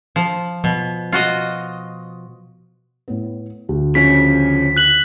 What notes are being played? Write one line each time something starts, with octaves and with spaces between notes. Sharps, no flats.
F3
B2 F3
F4 F#4 D#5
A2 B3
D2
C#3 F3 C#4 B6
F#6 F#7